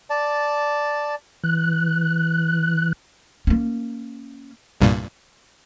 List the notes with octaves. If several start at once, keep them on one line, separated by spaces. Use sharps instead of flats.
D5 A5
E3 F#6
A#3 C#4
C2 G2 A#2